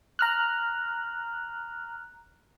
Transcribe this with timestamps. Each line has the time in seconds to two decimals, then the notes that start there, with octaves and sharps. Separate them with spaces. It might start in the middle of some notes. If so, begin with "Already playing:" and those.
0.19 A#5 F6 F#6